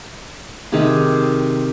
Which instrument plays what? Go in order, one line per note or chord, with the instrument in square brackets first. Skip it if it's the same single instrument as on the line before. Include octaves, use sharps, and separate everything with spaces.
[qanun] C3 D#3 G4 G#4